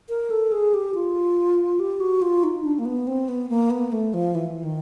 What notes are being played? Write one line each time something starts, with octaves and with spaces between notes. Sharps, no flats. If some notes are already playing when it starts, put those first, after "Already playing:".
A#4
A4
G#4
G4
F4
G4
F#4
F4
D#4
D4
A#3
B3
C4
B3
A#3
B3
A3
F3
E3
D#3